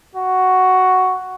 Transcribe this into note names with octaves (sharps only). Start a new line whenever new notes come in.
F#4